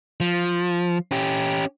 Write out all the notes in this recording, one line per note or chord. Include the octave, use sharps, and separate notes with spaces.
F3
C#4 G4